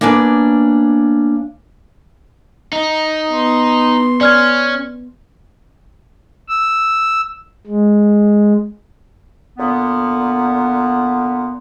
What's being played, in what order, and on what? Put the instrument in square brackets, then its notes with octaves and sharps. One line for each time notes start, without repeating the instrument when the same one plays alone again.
[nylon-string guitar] A#3 B3 C#4 D4 B4
[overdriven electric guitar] D#4
[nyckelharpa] B3 C6
[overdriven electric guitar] C#4 [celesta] D5 F6 G#6
[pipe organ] E6
G#3
[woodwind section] A#2 D3 B3